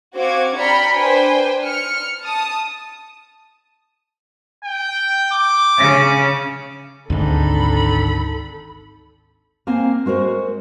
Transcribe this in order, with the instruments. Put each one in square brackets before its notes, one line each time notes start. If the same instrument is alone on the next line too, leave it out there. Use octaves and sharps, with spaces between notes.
[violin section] C4 F#4 F5 D6 G#6
D5 G5 A#5 B5 F6 C#7
D4 B4 C5 G5 G#5
F6 C#7
A5 D#6
[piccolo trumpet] G5
D6
[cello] C#3 C#4
[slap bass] G#1 [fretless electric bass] D2 G#2 [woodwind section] C4 D4 D#4 [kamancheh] A4 B5
[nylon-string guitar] A#3 C4 G#5
G#3 F#4 A#4 C5